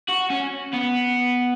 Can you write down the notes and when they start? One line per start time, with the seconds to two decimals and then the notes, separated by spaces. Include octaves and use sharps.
0.09 F#4
0.30 C#4
0.74 B3